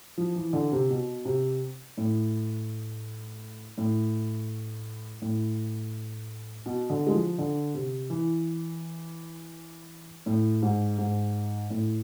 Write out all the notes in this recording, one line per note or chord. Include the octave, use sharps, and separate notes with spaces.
F3
E3
D3
C3
B2
C3
A2
A2
A2
B2
D3
G#3
F3
D3
C3
E3
A2
G#2
G#2
A2